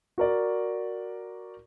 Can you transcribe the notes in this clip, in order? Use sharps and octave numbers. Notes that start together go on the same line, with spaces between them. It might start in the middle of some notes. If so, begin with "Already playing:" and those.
F#4 A#4 D5